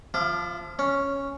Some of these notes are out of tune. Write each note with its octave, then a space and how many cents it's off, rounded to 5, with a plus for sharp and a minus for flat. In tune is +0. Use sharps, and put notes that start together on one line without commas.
F3 +0 E4 +40 D6 +35
C#4 +0 C#5 +0